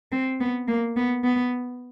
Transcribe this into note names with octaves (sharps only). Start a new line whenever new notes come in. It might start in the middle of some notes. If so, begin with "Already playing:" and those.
C4
B3
A#3
B3
B3